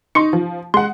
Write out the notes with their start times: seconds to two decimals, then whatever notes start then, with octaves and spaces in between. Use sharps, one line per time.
0.15 D#4 C6 C#6 C#7
0.33 F3
0.74 G#3 F#5 C6